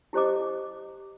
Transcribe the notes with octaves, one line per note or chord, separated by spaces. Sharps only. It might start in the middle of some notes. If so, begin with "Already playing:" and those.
E4 G4 C5 D#5 D6